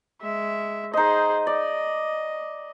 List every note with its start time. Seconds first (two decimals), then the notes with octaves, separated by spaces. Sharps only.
0.21 G#3 E5
0.93 D#4 G#4 C5 D#5
1.47 D5 D#5